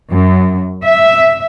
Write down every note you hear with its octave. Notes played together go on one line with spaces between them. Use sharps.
F#2
E5